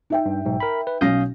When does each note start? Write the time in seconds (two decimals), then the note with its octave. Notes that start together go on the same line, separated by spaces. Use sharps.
0.10 D#4 E5 G5
0.26 G2
0.45 B1 G#2
0.60 A#4 B5
0.87 B4
1.01 B1 C#4 F5 D#6 G6 A#6